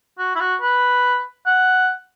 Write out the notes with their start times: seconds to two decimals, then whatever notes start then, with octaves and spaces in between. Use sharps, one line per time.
0.18 F#4
0.35 E4
0.40 F#4
0.62 B4
1.46 F#5